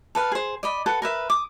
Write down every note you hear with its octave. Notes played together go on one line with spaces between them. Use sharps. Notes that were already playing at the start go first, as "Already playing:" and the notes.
A4 B4 F5
G#4 C5
D5 D#5 B5
A4 B4 F#5
A#4 B4 E5
D6 D#6